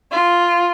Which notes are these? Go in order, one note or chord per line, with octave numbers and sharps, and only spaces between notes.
F4